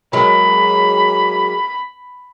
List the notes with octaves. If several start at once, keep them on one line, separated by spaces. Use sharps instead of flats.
F#3 G#3 A#3 B5